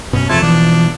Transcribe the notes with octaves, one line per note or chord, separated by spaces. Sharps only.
F#2 B2 C#4
E2 C3 F3 A3 E5 A5 C6 G#6
B2 E3 F3 D4